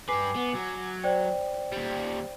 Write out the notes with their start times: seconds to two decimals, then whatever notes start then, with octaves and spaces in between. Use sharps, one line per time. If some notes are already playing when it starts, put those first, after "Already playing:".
0.09 G2 B4 G#5 D6 C7
0.36 B3
0.55 F#3
1.04 C5 D5 G5
1.73 D#2 G3